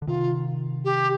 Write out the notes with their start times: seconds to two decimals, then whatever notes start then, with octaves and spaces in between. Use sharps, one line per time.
0.02 D3
0.07 C3 D#3 F4
0.85 G4